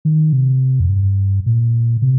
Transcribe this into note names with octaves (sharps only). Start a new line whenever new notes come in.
D#3
C3
F2
G2
A#2
C3